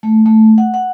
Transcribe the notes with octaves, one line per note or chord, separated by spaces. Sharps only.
A3
A3
F#5
F#5